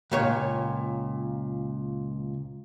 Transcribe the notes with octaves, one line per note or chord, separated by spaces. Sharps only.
C#2 A#2 C#5